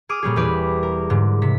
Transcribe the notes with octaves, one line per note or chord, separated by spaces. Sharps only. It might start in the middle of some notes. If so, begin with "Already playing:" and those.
G#4 D6 D#6 F6
A#2 G3 C#4 G#4
E1 E2 G4 B4 D5
A#4
G#2 D3
C3 B6